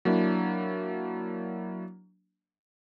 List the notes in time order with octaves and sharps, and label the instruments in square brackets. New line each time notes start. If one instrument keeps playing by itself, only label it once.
[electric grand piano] F#3 A#3 D4 E4